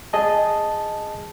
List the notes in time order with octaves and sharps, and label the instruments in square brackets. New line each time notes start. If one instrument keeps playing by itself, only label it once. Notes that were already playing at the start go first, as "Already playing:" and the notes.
[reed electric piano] G#4 D#5 A5